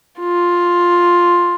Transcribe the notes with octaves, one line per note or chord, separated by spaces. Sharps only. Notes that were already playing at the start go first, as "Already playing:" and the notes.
F4